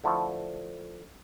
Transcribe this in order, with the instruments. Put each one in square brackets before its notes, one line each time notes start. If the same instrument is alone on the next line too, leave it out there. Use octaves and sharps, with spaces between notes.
[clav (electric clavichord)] D3 F3 A3 E4 A4